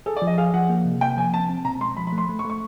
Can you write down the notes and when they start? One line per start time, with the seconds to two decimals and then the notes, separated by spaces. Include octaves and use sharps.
0.06 G#4 A4
0.17 D5
0.22 F3
0.27 D#5
0.38 G#4 F5
0.54 F3 F#5
0.69 A#3
0.85 C3
1.01 A#3 G5
1.17 F3 G#5
1.33 C4 A5
1.50 C4
1.65 B2 A#5
1.80 G#3 C6
1.97 F3 B5
2.07 B5
2.13 A3
2.18 C6
2.29 A3
2.39 C#6
2.45 A3
2.50 C#6